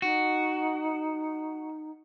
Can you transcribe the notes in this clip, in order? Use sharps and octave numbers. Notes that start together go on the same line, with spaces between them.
D#4 F#4